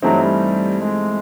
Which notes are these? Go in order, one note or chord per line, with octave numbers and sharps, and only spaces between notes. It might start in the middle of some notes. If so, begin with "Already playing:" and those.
G2 E3 F#3 A3 C4 D#4
G3
G#3